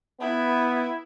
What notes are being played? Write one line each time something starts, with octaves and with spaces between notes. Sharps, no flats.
B3 E4